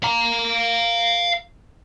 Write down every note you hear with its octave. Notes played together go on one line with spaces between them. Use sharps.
F5 A#5